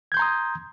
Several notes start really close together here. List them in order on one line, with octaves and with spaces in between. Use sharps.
G#6 G6 C6 A#5 D#6